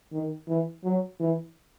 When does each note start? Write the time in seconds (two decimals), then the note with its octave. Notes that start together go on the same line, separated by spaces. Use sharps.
0.13 D#3
0.48 E3
0.84 F#3
1.20 E3